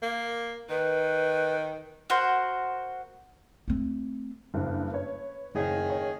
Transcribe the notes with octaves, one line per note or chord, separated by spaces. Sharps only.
A#3
D#3 B4
F#4 A#4 C5
A3 C4
F#1 G2
B4 C#5
F#1 D#3 G#4 C#5 F5
C#5